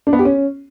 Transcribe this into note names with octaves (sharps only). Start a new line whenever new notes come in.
D4
B3
G4
C#4